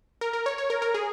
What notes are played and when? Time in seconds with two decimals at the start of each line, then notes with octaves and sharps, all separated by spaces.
0.21 A#4
0.33 A#4
0.46 C#5
0.58 C#5
0.70 A#4
0.82 A#4
0.94 G#4